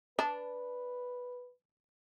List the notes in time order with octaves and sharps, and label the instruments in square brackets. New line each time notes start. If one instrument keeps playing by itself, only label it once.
[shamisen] D4 [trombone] B4 [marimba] A5